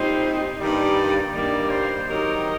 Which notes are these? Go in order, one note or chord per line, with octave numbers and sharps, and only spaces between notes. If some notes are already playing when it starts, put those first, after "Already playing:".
Already playing: A#2 G3 C4 D#4 C5
G2 D#3 G3 A#3 D5
G2 D#3 G3 A#3 D5
C5
D#3 F#3 C4 G4 A#4 D#5